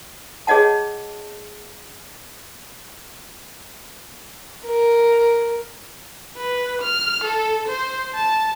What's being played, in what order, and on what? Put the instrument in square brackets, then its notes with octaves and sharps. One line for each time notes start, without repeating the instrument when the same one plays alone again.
[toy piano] G#4 C#5 D#5 F#5 A5
[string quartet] A#4
[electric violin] B4
F6
A4
C5
A5